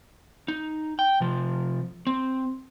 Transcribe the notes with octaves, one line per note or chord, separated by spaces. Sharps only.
D#4
G5
C3 F3
C4